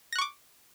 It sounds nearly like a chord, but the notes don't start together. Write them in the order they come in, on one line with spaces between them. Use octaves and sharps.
A#6 F#6 C#6 D6